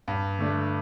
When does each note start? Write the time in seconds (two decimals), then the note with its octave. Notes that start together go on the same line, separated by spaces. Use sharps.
0.08 G2
0.39 D3 A3 D4